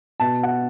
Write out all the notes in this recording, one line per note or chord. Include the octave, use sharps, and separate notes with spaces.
B2 A5
F#5